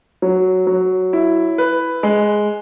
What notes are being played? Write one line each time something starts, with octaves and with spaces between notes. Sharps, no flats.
F#3
F#3
E4
B4
G#3